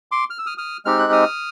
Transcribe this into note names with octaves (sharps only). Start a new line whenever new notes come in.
C6 D6
F6
E6
D#6 F6
D#6 F6
G#3 C4 D#4 G4 F6
F#6
D#6 F6